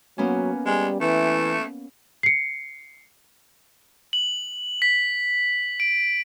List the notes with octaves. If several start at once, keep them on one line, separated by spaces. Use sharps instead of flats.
F#3 A#3 B3 C#4
G3 G#3
E3 A3
C7 C#7
F#7
B6
D7